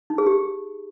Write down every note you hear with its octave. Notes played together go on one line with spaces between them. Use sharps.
D#4
G#4
G4